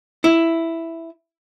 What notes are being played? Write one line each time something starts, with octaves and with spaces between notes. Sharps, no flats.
E4